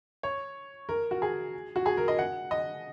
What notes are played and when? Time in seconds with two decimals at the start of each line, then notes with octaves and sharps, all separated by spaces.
0.23 C#5
0.89 A#4
1.11 F#4
1.22 G#4
1.76 F#4
1.86 G#4
1.97 A#4
2.08 D#5
2.19 F#5
2.51 D#5